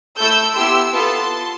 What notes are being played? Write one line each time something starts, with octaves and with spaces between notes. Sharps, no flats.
A3 E4 A4 E6 G6
B3 E4 G4 C6 E6
B3 F4 A4 A5 C6